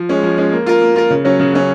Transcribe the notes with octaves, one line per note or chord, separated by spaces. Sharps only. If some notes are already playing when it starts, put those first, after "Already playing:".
Already playing: F3
G#3 C#4
F3
G#3 C#4
A#3
F4 A#4
A#3
F4 A#4
C#3
F#3 C#4
C#3
F#3 C#4